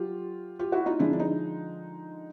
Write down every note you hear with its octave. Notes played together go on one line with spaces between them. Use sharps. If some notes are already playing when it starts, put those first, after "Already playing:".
Already playing: F#3 F4 G4
F4 G4
E4 F#4
D#4 F4
D3 F3 G#3 D4 E4
D4
D#4